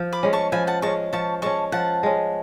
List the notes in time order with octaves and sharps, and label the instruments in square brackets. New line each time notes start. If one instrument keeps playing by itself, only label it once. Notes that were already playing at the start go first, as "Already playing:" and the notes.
Already playing: [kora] F3
[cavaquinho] B5 D6
[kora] G#3 C#4
[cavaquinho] A5 C#6
[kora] F3 [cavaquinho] G#5 B5
[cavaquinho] F#5 A5
[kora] G#3 C#4 [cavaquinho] A5 C#6
[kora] F3 [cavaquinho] A5 C#6
[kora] G#3 C#4 [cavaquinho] A5 C#6
[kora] F3 [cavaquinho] F#5 A5
[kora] G#3 C#4